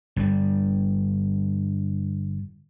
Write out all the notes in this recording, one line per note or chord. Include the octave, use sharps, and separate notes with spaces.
G2 D3 G3